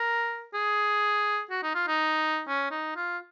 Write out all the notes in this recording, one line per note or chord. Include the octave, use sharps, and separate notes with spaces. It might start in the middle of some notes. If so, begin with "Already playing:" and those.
Already playing: A#4
G#4
F#4
D#4
F4
D#4
C#4
D#4
F4